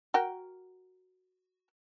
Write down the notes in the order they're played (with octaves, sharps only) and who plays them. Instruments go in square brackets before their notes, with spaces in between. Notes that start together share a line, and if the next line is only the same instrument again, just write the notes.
[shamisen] F#4 A#4 G5